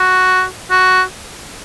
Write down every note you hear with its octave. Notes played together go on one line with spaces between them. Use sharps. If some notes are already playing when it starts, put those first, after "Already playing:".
Already playing: F#4
F#4